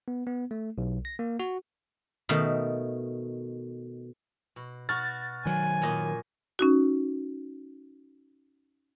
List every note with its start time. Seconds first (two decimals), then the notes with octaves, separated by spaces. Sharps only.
0.08 B3
0.27 B3
0.51 A3
0.78 B1
1.05 A#6
1.19 A#3
1.39 F#4
2.29 B2 D#3 A3
4.56 B2
4.89 B2 F#4 F6 A6
5.46 D#3 F#3 G#5
5.82 F#2 A#2 D#5
6.59 C#4 D#4 F#4